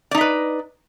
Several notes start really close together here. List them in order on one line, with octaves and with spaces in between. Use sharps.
D5 D#4 D#5 B4